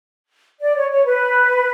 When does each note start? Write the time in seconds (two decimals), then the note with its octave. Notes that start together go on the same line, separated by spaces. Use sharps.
0.60 D5
0.76 C#5
0.91 C#5
1.06 B4